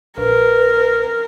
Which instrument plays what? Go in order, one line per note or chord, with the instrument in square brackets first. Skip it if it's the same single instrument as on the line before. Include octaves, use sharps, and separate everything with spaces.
[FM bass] A#1 [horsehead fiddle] A#4 [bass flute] B4